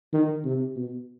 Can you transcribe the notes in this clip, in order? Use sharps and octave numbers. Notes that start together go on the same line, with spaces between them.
D#3
C3
B2